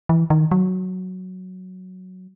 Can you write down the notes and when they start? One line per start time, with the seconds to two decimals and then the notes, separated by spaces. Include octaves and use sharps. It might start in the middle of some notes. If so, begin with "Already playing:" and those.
0.09 E3
0.30 D#3
0.51 F#3